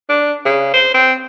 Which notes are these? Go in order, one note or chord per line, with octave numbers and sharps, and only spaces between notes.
D4
C#3
C5
C4